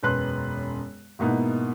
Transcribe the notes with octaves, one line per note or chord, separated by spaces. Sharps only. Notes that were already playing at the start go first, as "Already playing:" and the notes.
E1 F#2 B4 C6 F#6
G#2 B2 A#3 B3 D#4 E4